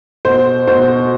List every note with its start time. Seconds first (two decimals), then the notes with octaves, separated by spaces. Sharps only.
0.25 B2 C5
0.67 B2 C5